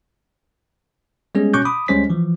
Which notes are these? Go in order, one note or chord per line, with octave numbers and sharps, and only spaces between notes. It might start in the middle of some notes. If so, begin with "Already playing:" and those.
G3 G#3 B3 C#4 G#4
B2 C#4 C#6 D6 F#6 G6
B5 D6 D#6
D2 G3 G#3 C#4 C5 B6
E3 F3